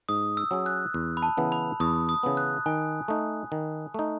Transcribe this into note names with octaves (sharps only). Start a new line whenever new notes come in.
G#2 D#6
E6
F#3 C#4 G#4
F#6
E2
B5
A5
C#3 E3 B3
B5
E2 D#6
D#6
C#3 E3 B3
F#6
D#3 G#5
A3 D#4
D#3
A3 D#4